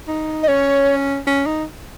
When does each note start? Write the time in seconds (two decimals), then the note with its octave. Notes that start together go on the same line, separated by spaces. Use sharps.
0.08 D#4
0.43 D#5
0.48 C#4 C#5
1.27 C#4
1.46 D#4